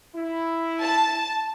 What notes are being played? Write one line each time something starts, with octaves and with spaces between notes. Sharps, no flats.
E4
A5